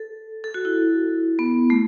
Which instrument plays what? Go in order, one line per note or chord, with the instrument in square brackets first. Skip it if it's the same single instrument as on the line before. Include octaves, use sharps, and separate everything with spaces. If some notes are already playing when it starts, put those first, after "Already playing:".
Already playing: [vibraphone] A4
A4
F#4
E4
B3
A3